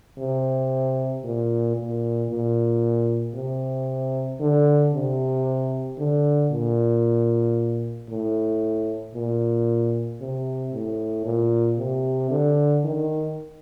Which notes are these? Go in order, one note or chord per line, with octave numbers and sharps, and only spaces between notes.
C3
A#2
A#2
A#2
C3
D3
C3
D3
A#2
A2
A#2
C3
A2
A#2
C3
D3
D#3